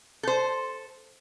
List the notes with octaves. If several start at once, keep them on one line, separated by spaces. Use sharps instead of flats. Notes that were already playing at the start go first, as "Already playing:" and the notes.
A4 C5